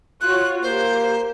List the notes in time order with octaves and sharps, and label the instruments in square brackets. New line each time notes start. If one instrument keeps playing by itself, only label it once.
[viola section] F4 F#4 C#5 [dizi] F#6
[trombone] A#3 [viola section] G4 [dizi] C5